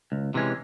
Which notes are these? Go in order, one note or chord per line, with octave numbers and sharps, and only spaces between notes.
C#2
C3 E3 G#3 C#4